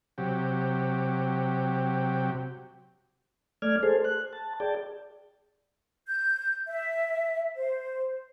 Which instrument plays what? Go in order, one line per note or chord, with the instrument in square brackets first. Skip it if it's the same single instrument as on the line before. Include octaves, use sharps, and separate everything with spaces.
[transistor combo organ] C3 F#3 G4
[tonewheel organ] A3 D5 F6 G#6
G#4 A4 C5
F#6
A5
G#4 D5 G5 A5
[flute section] G6
E5
C5